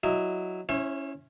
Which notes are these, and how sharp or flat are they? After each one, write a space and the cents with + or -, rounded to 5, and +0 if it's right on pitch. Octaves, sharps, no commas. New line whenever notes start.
F#3 +0 E4 +0 D#5 -5
C#4 +0 E4 +0 C5 +45